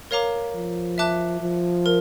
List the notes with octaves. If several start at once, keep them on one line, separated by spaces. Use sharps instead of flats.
A#4 C#5 F5 A#5 D6
F3
E5 A5 D6 F#6
F3
A#4